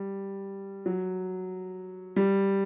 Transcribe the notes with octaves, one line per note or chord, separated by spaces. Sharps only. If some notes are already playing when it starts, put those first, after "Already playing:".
Already playing: G3
F#3
G3